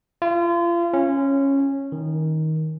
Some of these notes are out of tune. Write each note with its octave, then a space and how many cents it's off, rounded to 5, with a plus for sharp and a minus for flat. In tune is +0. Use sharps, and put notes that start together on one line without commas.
F4 -35
C#4 -10
D#3 +15